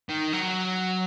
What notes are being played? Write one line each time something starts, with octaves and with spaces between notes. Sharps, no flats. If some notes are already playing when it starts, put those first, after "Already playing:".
D#3
F#3